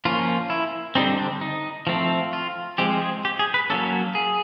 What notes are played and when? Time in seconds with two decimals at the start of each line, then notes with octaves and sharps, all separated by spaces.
0.05 F3 A#3 C#4 F4
0.50 E4
0.95 D3 G3 C4 D#4
1.19 D4
1.41 D#4
1.87 F3 A3 C4
2.33 F4
2.78 F3 G#3 C4 G4
3.02 G#4
3.25 G4
3.39 G#4
3.54 B4
3.70 F#3 A#3 C#4 A4
4.15 G#4